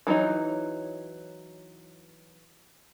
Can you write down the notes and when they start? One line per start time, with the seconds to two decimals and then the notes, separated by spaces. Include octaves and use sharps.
0.07 E3 F#3 A3 D#4 C#5